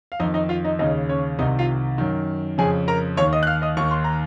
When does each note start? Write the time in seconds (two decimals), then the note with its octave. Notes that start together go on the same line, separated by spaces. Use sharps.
0.12 F5
0.20 F2 D#4 D#5
0.24 D#3
0.34 D#4 D#5
0.49 F4 F5
0.65 D#4 D#5
0.79 D#2 C#3 D#4 D#5
1.09 C#4 C#5
1.39 C2 C3 D#3 D#4 D#5
1.59 F4 F5
1.98 F#2 D#3
2.58 F2 C#3 G#4 G#5
2.88 A#4 A#5
3.17 D#2 D#3 C#5 C#6
3.33 D#5 D#6
3.43 F#6
3.47 F5 F6
3.62 D#5 D#6
3.77 D#2 D#3 C#6
3.91 C6
4.04 A#5